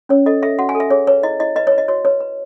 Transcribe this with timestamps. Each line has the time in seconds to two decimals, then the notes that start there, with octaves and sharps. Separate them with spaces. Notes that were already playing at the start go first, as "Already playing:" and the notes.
0.09 C#4 C#5
0.26 A4 D#5
0.43 A4 E5
0.59 F#4 F#5
0.69 G#5
0.75 A4
0.80 E5
0.90 G#4 C#5
1.07 B4 C#5
1.23 E4 D#5
1.40 E4 D#5
1.56 B4 D#5
1.67 C#5
1.72 B4
1.78 D#5
1.88 F#4 C#5
2.05 B4 C#5
2.20 B4